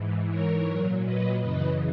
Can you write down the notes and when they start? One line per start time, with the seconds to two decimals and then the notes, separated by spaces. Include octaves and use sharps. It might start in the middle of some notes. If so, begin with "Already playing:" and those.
Already playing: G#2 E3
0.29 A#4 C#5
0.67 A#2 F#3
1.04 B4 D#5
1.41 F#2 C#3 E3 B4 D#5